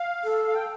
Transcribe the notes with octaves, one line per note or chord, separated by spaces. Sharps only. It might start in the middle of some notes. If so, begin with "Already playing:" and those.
Already playing: F5
A4
F5
G5